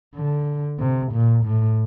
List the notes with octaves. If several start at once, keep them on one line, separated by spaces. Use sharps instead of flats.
D3
C3
A#2
A2